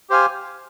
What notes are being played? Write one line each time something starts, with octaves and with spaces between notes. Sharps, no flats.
G4 C5 F5 G#5